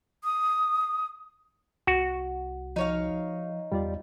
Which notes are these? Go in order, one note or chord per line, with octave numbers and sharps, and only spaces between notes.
D#6
C2 F#4
F3 D#4 C#5 F5
E2 G3 F4 D5